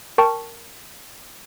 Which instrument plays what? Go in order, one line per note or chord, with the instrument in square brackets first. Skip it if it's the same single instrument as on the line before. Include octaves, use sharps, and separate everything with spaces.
[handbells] A#4 G5 A5 C#6